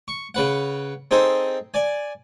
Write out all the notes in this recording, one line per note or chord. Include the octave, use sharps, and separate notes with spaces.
C#6
C#3 B4 F#5
C4 D#4 G#4 A4 C5
D5 G#5